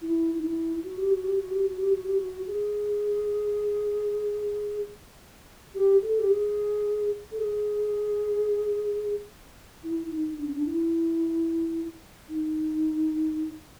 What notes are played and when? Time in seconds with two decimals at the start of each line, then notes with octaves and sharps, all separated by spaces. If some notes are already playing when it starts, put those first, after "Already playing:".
0.02 E4
0.38 D#4
0.43 E4
0.84 F#4
0.97 G4
1.10 F#4
1.24 G4
1.37 F#4
1.51 G4
1.64 F#4
1.77 G4
1.91 F#4
2.04 G4
2.17 F#4
2.47 G#4
5.74 G4
6.02 A4
6.19 G4
6.29 G#4
7.32 A4
7.38 G#4
9.83 E4
10.11 D#4
10.38 D4
10.46 C#4
10.55 D4
10.65 E4
12.29 D#4